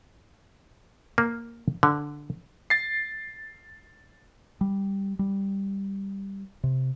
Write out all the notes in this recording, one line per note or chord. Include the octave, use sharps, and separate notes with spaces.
A#3
D3
A6 C7
G3
G3
C3